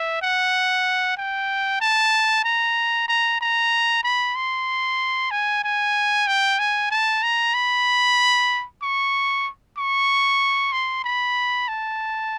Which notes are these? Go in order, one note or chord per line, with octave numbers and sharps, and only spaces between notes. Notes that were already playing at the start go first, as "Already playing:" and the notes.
Already playing: E5
F#5
G5
A5
A#5
A#5
A#5
B5
C6
G#5
G#5
G5
G#5
A5
A#5
B5
C#6
C#6
C6
B5
A5